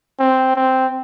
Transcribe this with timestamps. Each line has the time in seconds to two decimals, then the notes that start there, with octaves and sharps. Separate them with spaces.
0.19 C4
0.56 C4